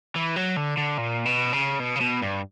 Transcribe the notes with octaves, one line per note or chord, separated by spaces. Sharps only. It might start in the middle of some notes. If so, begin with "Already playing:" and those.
E3
F#3
D3
D3
A#2
B2
C#3
B2
C#3
B2
G2